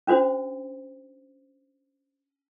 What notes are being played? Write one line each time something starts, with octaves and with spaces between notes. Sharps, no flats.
C#4 D4 F#4 C5